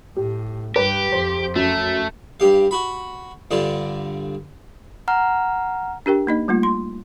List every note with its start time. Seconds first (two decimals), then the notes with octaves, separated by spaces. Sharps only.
0.16 A2 G4
0.76 G2 G4 B4
1.12 F2 C5
1.56 F#2 A3
2.40 G2 G4 F5
2.71 F#4 B5
3.51 G2 D3 F4 D5
5.08 F#5 A#5 F6
6.06 D4 G4 A#4 G5
6.27 A#3 D#4 D#5
6.48 G3 A3 A#3 F4
6.63 C6